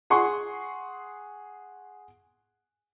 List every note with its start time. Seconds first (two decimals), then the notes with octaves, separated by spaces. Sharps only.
0.10 G#4 F#5 C6 C#6